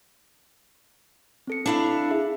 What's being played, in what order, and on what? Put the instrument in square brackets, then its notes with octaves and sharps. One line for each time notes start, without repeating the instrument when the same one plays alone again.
[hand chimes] C4 A4 C#7
[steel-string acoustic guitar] D4 E4 F5
[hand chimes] G#4 E5